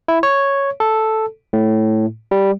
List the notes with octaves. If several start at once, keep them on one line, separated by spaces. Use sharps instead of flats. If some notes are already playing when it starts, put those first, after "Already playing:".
E4
C#5
A4
A2
G3